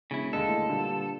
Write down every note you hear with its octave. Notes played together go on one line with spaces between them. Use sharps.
E1 C#3 E4
D#2 D3 G#3 A4
A2
G2 A#2 D3